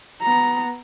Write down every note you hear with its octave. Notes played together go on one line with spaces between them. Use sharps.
B3 A#5